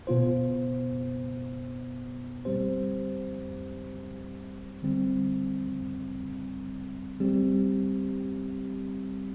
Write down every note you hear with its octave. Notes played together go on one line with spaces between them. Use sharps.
B2 B3 F4 C5
G3 C4 G4 C5
D3 G3 C4
G3 C4 G4